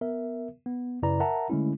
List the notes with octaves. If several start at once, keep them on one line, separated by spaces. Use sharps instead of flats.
B3 A#4 E5
B3
F#2 C#3 E4 B4 D5 A#5
A#4 E5 F#5 A5 A#5
D3 G#3 A3 C#4 E4